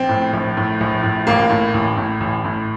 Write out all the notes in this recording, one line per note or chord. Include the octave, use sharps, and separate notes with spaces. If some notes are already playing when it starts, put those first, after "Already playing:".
Already playing: A#1 C4
A2
A#1
A2
A#1
A2
A1 A#3
A2
A1
A2
A1
A2